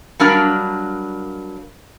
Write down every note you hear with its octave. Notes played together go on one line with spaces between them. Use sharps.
F#3 G3 A#3 D4 A#4